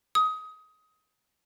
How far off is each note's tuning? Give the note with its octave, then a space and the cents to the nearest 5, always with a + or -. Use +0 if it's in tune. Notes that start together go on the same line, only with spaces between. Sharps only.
D#6 +20